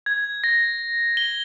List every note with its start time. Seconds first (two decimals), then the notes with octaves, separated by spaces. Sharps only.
0.06 G#6
0.44 A#6
1.17 G7